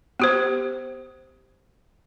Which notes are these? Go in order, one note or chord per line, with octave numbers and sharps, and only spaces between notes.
B3 G4 C5